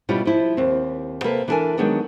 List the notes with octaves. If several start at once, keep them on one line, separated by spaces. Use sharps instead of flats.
B2 G3 C#4 E4 F4
F3 E4
D#2 C4
C3 A#3 A4 B4
E3 D4 D#4 A4 A#4 G#5
D#3 F#3 G#3 B3 D4